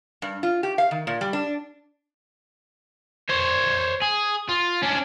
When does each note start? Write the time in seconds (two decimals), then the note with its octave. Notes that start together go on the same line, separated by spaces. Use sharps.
0.22 G2
0.43 F4
0.63 G4
0.78 F5
0.91 D#3
1.07 A#2
1.21 G3
1.33 D4
3.29 C5 C#5
4.02 G#4
4.49 F4
4.83 C#4 D4